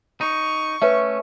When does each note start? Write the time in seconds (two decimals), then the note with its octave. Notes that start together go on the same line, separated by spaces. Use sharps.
0.21 D#4 C#6
0.82 A3 C#4 B4 C#5 E5